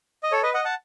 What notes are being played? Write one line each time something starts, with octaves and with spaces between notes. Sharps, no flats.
D#5
A4 C#5
B4 D#5
D#5 F#5
F#5 A5